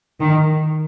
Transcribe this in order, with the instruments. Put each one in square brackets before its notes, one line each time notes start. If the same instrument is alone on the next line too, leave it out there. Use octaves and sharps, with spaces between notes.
[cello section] D#3